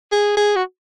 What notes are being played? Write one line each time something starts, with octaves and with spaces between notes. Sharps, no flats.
G#4
G#4
F#4